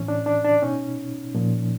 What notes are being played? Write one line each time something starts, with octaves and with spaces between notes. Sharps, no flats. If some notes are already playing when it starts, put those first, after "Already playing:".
Already playing: A2 E3 C#4
D4
D4
D4
B2 C#4 D#4
A#2 F3